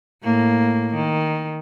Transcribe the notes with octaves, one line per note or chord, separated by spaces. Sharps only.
A2 A#3
D#3